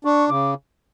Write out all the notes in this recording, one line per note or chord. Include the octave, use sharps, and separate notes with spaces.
D4 C#6
C#3 D6